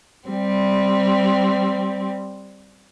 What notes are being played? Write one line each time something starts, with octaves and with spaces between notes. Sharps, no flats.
G3 C4